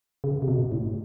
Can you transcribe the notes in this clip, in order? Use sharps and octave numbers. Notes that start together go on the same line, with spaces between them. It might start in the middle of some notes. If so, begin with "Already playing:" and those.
C#3
C3
B2
A2